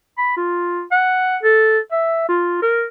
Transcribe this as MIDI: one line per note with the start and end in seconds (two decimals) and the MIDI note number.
0.18 0.34 83
0.37 0.81 65
0.91 1.37 78
1.43 1.79 69
1.92 2.24 76
2.29 2.58 65
2.62 2.84 70